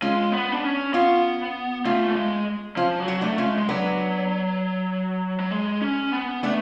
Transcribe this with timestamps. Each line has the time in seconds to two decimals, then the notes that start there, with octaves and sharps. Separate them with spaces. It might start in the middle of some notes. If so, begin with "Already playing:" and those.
0.02 G#3 C#4 F4
0.32 B3
0.52 D4
0.64 C#4
0.93 B3 C#4 F4
1.85 A3 C#4 F4
2.09 A3
2.16 G#3
2.76 F3 C#4 F4
3.00 F#3
3.08 F#4
3.21 A3 D4 F#4
3.38 C#4 F4
3.46 G#3
3.58 G#3
3.69 F#3 B3 D4
5.40 F#3
5.51 G#3
5.82 C#4
6.12 B3
6.43 A3 B3 D4